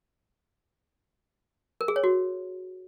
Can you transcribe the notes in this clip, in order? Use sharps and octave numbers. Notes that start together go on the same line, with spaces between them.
A#4
G#4
C#5
F#4